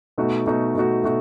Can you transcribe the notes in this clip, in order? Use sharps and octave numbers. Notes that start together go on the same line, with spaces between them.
B2 A3 D#4 F#4
B2 A3 D#4 F#4
B2 A3 D#4 F#4
B2 A3 D#4 F#4